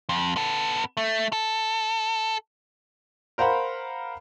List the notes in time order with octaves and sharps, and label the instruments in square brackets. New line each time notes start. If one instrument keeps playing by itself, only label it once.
[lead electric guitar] F2
B3 A4
A3
A4
[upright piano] A#4 C5 F5 F#5 B5